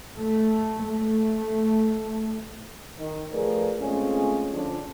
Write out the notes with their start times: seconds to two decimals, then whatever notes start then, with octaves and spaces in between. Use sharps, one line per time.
0.19 A3
0.85 A3
2.98 D#3
3.33 F3 A3 G#4 A#4 B4 D5
3.79 G#3 A3 C4 C#4 F4 G#4
4.54 D3 F3 C#4 D4